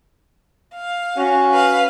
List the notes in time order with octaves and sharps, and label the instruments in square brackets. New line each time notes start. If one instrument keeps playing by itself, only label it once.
[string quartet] F5
[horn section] C#4 F#4
[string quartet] B4 F5